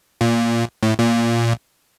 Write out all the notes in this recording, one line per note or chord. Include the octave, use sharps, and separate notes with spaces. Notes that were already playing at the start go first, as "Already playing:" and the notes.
A#2
A2
A#2